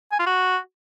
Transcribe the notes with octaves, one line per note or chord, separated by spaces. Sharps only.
G#5
F4
F#4